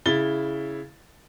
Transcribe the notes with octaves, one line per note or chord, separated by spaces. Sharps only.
C#3 E4 A6 G7